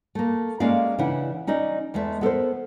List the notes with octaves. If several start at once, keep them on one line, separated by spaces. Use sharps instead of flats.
A3 A#3
G#3 A#3 C#4 G#4 D5 F5
C#3 E3 D4 E4 F#5
C#4 D#4 D5 D#5
E2 G#3 A3 E5
B3 A4 A#4 C5